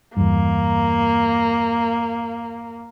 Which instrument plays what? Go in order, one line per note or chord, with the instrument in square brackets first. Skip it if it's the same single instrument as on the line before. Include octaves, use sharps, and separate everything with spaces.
[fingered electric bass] E2 G2 [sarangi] A#3